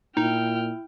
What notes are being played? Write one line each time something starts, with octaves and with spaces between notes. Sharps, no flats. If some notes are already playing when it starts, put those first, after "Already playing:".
A#2 D#4 E4 G5 F6